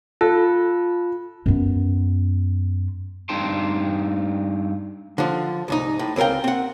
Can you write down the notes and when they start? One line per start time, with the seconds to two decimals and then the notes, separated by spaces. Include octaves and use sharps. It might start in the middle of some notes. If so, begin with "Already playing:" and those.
0.21 F4 A4
1.46 F#2 B3
3.29 G2 C4 D#4 G5 A5 C6
5.18 D3 F3
5.68 C2 G#2 D#4
5.99 A2
6.16 C#2 C4 A#4 F5 G5
6.44 C4 F#5